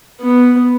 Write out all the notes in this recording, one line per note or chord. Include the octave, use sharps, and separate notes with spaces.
B3